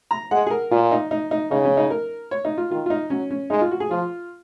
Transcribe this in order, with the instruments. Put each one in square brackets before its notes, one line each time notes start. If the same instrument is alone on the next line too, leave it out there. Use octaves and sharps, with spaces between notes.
[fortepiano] A#5
[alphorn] G#3 [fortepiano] F#5
[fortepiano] G#4
A#4
[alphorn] A#2 [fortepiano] F4
[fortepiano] D#4
D#4
D#4
[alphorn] C#3 [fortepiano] D#4
[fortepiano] C#4
D#4
A#4
C#5
D#4
F4
[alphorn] D#3 [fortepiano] F4
[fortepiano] F4
D#4
[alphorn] F#3 [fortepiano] C#4
[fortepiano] C#4
[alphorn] G#3 [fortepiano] D#4
[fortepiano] F4
F#4
G#4
[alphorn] F3 [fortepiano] F4